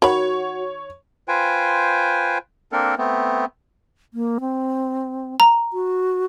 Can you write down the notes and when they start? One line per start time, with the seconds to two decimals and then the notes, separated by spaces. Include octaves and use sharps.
0.02 D#3 F#4 C#5 B5
1.28 F4 B4 C5 G5 G#5
2.72 A#3 C4 D4 A4 A#4
2.98 A3 B3 C4
4.14 A#3
4.40 C4
5.40 A#5
5.73 F#4